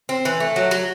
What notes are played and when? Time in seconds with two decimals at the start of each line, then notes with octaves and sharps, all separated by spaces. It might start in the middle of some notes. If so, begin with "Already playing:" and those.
0.09 C4
0.25 E3
0.40 A3
0.56 F#3
0.71 F#3